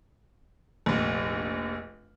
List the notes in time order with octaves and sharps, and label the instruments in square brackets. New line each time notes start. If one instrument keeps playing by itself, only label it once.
[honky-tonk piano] F1 A#1